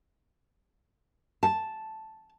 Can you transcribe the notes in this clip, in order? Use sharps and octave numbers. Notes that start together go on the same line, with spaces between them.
A5